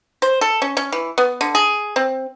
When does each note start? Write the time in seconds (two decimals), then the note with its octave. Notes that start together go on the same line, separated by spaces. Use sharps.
0.22 C5
0.41 A4
0.62 C#4
0.77 C#4
0.92 E3
1.18 B3
1.41 D3
1.55 G#4
1.96 C4